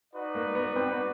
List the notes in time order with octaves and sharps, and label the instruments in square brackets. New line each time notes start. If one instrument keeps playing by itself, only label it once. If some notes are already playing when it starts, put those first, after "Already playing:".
[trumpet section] D#4 F#4 B4 D5
[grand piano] A#3
B3
C4
B3